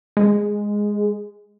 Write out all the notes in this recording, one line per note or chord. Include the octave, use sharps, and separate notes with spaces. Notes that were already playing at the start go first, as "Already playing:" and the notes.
G#3